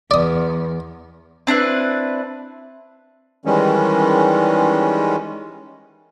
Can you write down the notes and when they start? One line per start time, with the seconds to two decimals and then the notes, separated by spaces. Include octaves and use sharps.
0.11 E2 D5 D#6
1.47 C4 D4 E4 B4
3.45 D#3 E3 G3 G#3 C#4